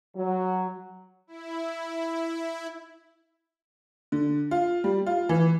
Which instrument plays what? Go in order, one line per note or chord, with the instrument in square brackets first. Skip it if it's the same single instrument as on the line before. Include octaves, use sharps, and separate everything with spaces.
[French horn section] F#3
[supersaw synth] E4
[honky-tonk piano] D3
F4
G3
F4
E3